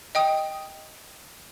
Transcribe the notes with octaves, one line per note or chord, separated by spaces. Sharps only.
D#5 G5 D#6